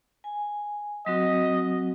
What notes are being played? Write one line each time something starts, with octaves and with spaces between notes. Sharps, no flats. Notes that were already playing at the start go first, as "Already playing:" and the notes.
G#5
F#3 C4 F#4 D#5